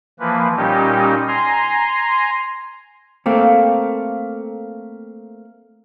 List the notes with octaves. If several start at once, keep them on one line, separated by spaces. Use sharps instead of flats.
E3 F3 A#3 B4
A#2 G3 C#4 D#4 G4
G#5 A#5 C6
A3 A#3 C4 F5